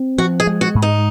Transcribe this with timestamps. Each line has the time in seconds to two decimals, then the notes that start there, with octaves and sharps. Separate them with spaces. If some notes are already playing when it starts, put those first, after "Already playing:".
Already playing: C4
0.18 F3 F#4
0.40 G#4
0.47 G#3
0.61 F#4
0.75 G#2
0.82 D#4